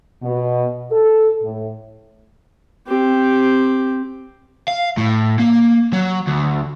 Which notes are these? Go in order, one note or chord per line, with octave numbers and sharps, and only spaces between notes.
B2
A4
A2
C4 G4
F5
A2
A#3
F#3
D2